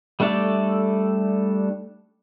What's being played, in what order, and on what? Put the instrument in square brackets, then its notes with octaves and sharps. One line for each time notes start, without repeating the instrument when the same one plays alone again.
[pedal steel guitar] G3 A3 D4 A4 D5